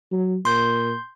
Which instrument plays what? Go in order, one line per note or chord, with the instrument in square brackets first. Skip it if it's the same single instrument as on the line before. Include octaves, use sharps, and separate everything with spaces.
[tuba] F#3
[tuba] A#2 [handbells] C6 G6